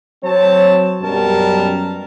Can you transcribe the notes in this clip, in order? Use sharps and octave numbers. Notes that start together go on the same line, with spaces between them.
F#3 C4 C#5 A5
F#2 B2 G3 A#4 A5